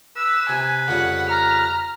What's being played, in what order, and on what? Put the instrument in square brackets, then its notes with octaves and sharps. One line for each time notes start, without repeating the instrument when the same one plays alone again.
[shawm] B4 [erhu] E6
[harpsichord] C3 [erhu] G#5
[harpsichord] F2 C#3 G3 [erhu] F#5
[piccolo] A#5 [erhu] F6